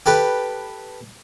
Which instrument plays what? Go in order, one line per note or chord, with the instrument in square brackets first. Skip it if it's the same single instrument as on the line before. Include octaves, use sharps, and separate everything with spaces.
[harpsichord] G4 A4 B4